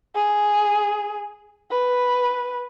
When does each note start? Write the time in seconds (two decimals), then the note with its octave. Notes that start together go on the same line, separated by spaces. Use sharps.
0.15 G#4
1.71 B4